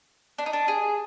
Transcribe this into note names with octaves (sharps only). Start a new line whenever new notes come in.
D4
D#4
D4
G#4